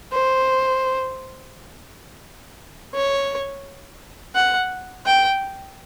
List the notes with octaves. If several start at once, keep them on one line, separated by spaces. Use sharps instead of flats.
C5
C#5
F#5
G5